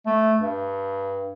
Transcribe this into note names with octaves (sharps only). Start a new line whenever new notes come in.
A3
G2